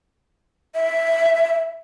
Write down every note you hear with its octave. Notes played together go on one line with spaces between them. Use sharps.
E5